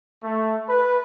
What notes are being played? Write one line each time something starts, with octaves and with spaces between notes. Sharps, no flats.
A3
B4